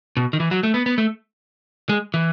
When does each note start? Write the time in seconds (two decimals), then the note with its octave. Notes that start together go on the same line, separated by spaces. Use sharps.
0.17 B2
0.33 D#3
0.40 E3
0.51 F#3
0.63 A3
0.74 B3
0.86 B3
0.98 A3
1.89 G#3
2.14 E3